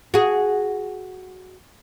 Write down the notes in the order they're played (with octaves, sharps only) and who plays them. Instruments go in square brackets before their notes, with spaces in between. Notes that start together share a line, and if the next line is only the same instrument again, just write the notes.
[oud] F#4 G#4